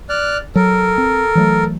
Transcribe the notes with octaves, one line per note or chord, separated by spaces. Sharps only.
D5 F6 F#6
F#3 A4 A#4
C4
E3 F#3 A3